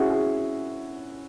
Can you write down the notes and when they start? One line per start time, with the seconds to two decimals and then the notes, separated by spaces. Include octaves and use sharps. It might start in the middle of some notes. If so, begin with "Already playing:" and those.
Already playing: C#4 E4 F#4 G#4
0.10 G#4